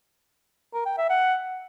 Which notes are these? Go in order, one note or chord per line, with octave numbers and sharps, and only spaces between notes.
A#4
G5
E5
F#5